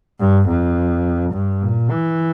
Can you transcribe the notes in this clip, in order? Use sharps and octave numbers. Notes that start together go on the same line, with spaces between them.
G2
F2
G2
A#2
E3